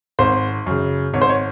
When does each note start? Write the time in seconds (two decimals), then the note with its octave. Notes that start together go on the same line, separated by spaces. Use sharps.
0.19 G#1 C5
0.66 F#2 C#3
1.14 G#1 C#5
1.22 C5
1.29 C#5